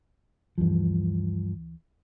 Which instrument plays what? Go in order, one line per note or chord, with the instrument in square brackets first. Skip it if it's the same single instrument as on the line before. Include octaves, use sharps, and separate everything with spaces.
[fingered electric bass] D2 E3 [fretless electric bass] G2 F3